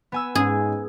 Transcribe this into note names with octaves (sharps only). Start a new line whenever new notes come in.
B3 G#5 E6
G#2 C#4 G#4